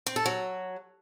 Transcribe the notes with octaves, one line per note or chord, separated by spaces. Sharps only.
C4
A4
F#3